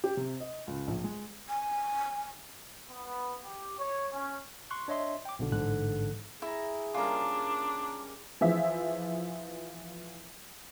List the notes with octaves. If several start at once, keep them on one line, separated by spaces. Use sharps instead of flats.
G4
C3
D#5
C#2
A#1
G#3
G#5
B3
G4
C#5
C#4
C6 C#6 F#6
D4 C#5 D#5 E5 C6
G5 D6
B1 B2 D3
A1 G#2 D3 A4 F#6
E4 G#4 E5 A#5
C#3 G3 A#3 D4 F4 A#4
E3 F3 G#4 E5